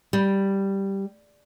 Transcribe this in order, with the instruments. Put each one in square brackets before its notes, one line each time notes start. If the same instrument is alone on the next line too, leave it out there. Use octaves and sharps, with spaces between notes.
[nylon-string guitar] G3